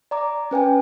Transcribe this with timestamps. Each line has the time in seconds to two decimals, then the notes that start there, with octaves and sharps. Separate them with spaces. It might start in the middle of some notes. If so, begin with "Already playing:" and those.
0.11 D5 A#5 D6
0.51 C#4 B4 G5 G#5